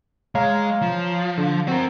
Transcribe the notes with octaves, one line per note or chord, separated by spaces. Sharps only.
G#3 C#5 F5 A#5
F3
D3
C4 F#4 A#4